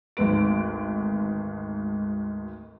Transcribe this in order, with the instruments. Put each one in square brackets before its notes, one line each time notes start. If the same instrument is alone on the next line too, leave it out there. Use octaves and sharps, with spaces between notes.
[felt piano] G#1 D2 G#2 B4 D7